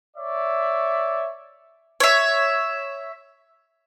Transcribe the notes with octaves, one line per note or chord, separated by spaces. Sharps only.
C#5 D5 E5
C#5 E5